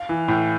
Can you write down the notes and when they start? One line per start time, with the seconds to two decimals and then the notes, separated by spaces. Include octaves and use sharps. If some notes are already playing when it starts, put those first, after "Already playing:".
Already playing: F5
0.09 E3
0.28 A2